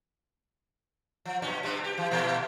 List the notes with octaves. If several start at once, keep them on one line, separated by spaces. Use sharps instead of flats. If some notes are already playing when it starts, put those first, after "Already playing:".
F3
G2 B2 C#4
C3 G3 D4
G4
E3
A#2 E3 A3